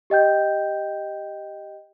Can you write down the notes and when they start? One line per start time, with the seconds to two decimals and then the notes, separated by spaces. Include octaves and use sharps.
0.10 G4 D#5 G5 G6